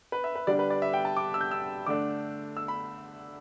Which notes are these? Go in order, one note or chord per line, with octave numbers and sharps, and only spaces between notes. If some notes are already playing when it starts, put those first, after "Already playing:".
B4
E5
B4
D3 G3 D4 D5
B4
D5
E5
G5
A5
D6
E6
G6
E6
D3 A3 D4 D6
E6
B5